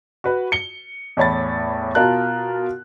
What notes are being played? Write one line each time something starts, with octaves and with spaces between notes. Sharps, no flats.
F#4 B4
C#7 G7
E2 A2 C#5 B5 A6
B2 F4 A#4 A5 F#6